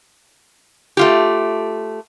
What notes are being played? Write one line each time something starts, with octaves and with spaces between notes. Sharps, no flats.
A3 F4 G4